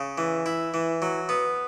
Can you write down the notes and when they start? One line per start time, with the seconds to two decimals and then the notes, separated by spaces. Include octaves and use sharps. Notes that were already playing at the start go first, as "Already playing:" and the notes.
Already playing: C#3
0.18 E3
0.46 E4
0.74 E3
1.02 F#3
1.29 B3